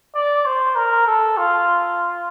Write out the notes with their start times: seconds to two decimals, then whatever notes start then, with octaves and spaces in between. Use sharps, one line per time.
0.15 D5
0.45 C5
0.75 A#4
1.07 A4
1.37 F4